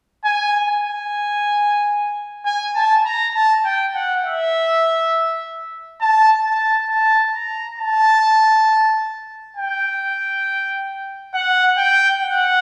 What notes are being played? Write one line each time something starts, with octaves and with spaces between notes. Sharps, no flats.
G#5
G#5
G#5
A5
A#5
A5
G5
F#5
E5
A5
A5
A5
A#5
A5
G5
F#5
G5
F#5